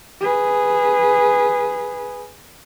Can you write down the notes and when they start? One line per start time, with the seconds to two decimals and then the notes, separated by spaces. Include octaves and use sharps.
0.21 G#4 B4